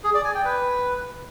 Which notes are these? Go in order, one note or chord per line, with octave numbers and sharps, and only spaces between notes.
G#4
D5
G#5
G5
B4